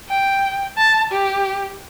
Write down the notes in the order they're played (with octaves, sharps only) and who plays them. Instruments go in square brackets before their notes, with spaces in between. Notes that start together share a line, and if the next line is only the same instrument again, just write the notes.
[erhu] G5
A5
G4